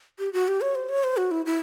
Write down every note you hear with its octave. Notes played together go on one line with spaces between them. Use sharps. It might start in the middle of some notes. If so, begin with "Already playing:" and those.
G4
F#4
G4
C#5
C5
C#5
C5
F#4
E4
E4